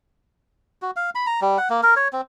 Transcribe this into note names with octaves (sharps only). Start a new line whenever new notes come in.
F#4
F5
B5
A#5
G3
F#5
A#3
A#4
C#5
C4